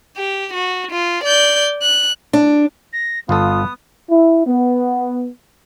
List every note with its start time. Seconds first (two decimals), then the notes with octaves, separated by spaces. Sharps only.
0.17 G4
0.53 F#4
0.91 F4
1.24 D5 G6
1.82 F#6
2.33 D4
2.92 A#6
3.29 G1 B3 F4 A4 D#6
4.11 E4
4.47 B3